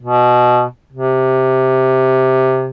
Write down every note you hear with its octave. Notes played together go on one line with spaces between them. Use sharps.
B2
C3